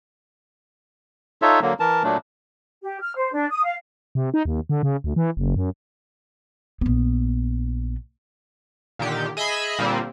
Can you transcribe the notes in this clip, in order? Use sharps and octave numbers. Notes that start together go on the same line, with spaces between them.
D#4 F4 A4 C#5 E5
D3 F#3 A#3
E3 A#4 A5
A#2 F#3 A3 D4
G4
F6
C5
D4
D#6
F5
C3
D#4
D#2
D3
C#3
D2
E3
F#1
F#2
A#1 B3
A#2 D3 D#3 G4
G#4 D#5 E5 G#5 B5
A#2 D3 G3 A#3 C4